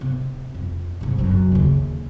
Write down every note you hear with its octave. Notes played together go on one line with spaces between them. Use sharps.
C3
F2
C2 G#2
F#2 F#3
D#2 C#3